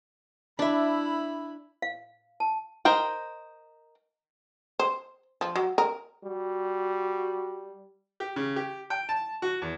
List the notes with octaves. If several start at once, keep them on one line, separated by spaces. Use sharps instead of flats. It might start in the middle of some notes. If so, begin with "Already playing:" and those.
D4 E4 E5 B5
F5
A5
A#4 C5 D#5 G5
C5
F3
F#3
A#4
G3 F#4
G4
C#3
G4
G5
A5
F#4
E2